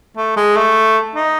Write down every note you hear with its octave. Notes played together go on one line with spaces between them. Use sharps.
A3
G#3
A3
D#4